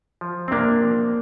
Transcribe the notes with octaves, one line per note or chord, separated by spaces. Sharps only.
F3
C4
C3 A#3 D4
F3